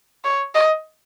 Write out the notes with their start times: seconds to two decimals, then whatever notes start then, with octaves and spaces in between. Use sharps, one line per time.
0.24 C#5
0.55 D#5